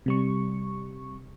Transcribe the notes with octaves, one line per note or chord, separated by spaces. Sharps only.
C3 G3 C#6